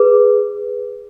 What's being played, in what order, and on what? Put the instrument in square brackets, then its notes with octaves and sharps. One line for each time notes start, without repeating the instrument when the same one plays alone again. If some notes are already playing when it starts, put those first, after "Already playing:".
Already playing: [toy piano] G#4 B4